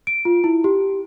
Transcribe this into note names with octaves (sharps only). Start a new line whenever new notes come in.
D7
F4
E4
G4